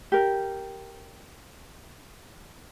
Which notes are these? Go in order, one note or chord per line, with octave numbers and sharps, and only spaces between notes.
G4 A#4